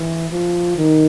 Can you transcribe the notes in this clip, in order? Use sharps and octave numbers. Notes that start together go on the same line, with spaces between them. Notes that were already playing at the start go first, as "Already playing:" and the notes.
Already playing: E3
F3
D#3